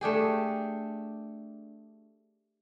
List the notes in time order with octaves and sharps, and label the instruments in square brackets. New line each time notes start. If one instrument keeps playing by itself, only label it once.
[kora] A3 D4 G4 G#4